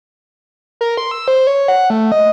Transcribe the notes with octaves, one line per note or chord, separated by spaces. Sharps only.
A#4
C6
E6
C5
C#5
F#5
A3
D#5